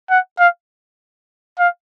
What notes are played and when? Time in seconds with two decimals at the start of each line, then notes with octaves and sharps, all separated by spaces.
0.10 F#5
0.39 F5
1.59 F5